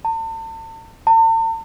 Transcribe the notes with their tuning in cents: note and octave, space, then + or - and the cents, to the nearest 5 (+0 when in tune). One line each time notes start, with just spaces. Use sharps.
A5 +40
A5 +45